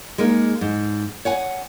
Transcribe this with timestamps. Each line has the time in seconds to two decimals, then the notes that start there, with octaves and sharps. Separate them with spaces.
0.18 G#3 A#3 D#4
0.61 G#2
1.25 C#5 F#5 G#5